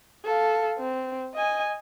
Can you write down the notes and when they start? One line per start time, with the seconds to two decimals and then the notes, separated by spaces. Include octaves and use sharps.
0.25 A4 F5
0.78 C4
1.34 D#5 G#5